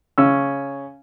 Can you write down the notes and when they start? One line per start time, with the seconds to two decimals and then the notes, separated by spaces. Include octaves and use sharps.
0.18 C#3 C#4 E6